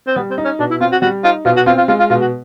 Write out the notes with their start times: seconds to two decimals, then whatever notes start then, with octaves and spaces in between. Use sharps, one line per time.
0.07 C4
0.16 G3 B3
0.30 C4
0.38 D#4
0.45 C#4
0.59 B2 D4
0.71 E4
0.81 C4 F4
0.92 F#4
1.02 G3 F#4
1.24 D#4 F4
1.45 B2 F4
1.56 F#4
1.66 C4 F4
1.78 F4
1.88 G#3 F4
1.99 F4
2.10 B2 F4
2.21 F#4